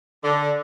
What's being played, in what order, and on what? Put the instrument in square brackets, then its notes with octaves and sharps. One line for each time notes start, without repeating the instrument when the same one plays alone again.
[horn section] D3